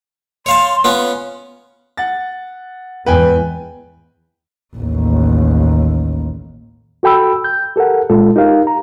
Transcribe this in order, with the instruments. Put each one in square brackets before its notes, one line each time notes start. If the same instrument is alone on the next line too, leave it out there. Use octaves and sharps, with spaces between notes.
[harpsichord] C#5 F5 A5 [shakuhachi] C6
[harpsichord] B3 C#4 F4
[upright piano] F#5 A6
[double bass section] E2 G#2 E3 [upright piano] B4 G5 G#5
[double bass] A1 D#2
[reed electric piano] F#4 A4 G5 B5 E6
G6
G4 A4 A#4 F#5
A#2 G#3 F4 A4
D#4 G4 A#4 F5
A#5